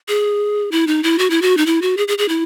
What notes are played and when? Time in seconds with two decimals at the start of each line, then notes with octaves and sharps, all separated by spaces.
0.08 G#4
0.72 E4
0.87 D#4
1.03 E4
1.19 F#4
1.30 E4
1.42 F#4
1.57 D#4
1.66 E4
1.82 F#4
1.97 G#4
2.08 G#4
2.18 G#4
2.29 E4